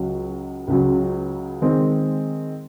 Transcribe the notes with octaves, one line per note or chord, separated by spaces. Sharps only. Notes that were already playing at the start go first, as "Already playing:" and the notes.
Already playing: C#2 C#3 F#3
C#2 C#3 F#3
D#3 G#3 C4